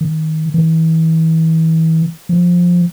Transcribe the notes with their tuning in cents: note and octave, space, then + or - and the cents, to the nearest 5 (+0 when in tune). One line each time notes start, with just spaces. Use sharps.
D#3 +20
E3 -35
F3 +10